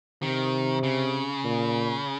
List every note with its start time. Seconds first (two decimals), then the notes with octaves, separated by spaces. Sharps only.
0.22 C3 D#3
0.83 C#3
1.44 A#2